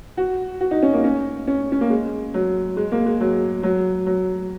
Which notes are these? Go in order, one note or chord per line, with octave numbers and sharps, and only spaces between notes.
F#4
F#4
D#4
C#4
A#3
C#4
C#4
C#4
A#3
G#3
F#3
G#3
A#3
G#3
F#3
F#3
F#3